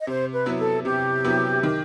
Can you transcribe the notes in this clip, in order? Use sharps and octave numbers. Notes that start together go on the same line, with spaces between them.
D#5
C3 C5
B4
F#3 B3 E4
A4
C3 G4
F#3 B3 E4
D#3